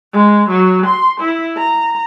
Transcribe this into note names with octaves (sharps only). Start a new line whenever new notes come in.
G#3
F#3
C6
E4
A#5